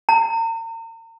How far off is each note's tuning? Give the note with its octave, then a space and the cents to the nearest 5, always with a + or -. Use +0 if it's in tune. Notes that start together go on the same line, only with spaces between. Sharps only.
A#5 -40